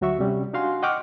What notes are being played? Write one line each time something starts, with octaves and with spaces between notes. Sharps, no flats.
D2 F#3 F#4 E5 C#6
C3 G3 C#4
D4 D#4 F#4 F5 G#5 C6
D#5 F#5 G5 C#6 D6 F6